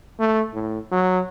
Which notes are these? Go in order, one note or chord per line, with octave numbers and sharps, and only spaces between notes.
A3
A2
F#3